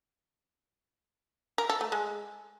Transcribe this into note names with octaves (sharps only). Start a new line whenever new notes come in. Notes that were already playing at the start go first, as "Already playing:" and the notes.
A#4
A4
A3
G#3